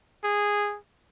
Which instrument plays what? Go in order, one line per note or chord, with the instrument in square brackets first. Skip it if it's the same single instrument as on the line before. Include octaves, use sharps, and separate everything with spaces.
[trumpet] G#4